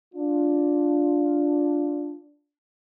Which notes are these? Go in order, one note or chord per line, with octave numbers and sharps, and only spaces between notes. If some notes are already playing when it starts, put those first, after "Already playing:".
D4 F4